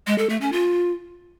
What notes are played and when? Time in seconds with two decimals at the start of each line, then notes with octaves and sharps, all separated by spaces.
0.07 G#3
0.18 A4
0.29 A3
0.41 C#4
0.52 F4